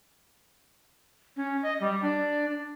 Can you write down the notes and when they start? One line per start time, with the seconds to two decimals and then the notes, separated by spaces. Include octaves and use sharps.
1.37 C#4
1.63 D#5
1.80 G3
2.02 D4